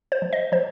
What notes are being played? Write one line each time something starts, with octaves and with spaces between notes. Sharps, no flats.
C5
F3
D#5
F3 C5